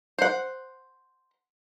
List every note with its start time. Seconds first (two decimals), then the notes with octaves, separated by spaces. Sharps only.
0.19 C5 F#5